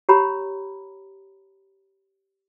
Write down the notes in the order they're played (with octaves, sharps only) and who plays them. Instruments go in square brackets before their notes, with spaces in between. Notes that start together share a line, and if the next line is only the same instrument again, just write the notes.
[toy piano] G4 C#5 A#5 B5